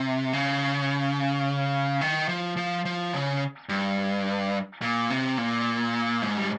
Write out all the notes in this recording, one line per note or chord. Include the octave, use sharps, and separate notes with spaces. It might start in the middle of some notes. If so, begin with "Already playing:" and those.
Already playing: C3
C#3
D#3
F3
F3
F3
C#3
G2
A#2
C3
A#2
G#2
G3